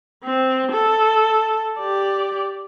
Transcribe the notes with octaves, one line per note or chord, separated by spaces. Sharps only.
C4
A4
G4 D5